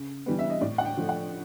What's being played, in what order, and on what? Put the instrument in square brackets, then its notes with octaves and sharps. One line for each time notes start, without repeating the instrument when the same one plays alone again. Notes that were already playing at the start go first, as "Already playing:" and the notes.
Already playing: [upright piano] C#3
E3 G3 B3
E5
D#5
A2 D5
F#5
G5
F3 A3
F#5